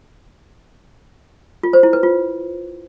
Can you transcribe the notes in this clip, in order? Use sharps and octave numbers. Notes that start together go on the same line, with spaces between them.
F4
C5
E4
B4
F4